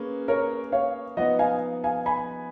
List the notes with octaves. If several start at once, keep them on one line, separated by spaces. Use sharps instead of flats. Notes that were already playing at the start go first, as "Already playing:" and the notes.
Already playing: A#3 C#4 G#4 B4
A#4 C#5
C#5 F5
F3 B3 D#4 D#5 F#5
F5 G#5
F5 G#5
G#5 B5